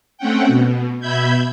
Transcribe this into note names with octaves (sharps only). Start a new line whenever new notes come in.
A3 C4 C#4 F#5 G5
B2
B2 E5 B5 G6 G#6